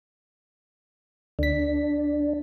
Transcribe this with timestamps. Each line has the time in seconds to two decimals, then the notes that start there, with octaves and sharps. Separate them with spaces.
1.39 D2 D4 B6